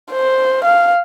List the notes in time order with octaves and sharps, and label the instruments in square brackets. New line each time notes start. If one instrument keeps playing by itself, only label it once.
[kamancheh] C5
F5